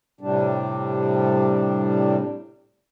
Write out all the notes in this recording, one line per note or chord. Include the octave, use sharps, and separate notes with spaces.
A2 C3 G3 D4